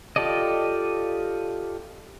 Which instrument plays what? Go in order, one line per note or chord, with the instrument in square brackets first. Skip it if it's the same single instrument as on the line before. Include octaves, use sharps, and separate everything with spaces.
[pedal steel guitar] F4 G4 A4 D5 D#5